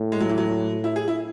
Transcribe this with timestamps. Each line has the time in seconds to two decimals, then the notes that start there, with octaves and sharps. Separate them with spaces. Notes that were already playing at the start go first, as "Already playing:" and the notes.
Already playing: A2
0.12 G#3
0.20 F#3
0.29 E3
0.38 F#3
0.84 E4
0.96 G#4
1.08 E4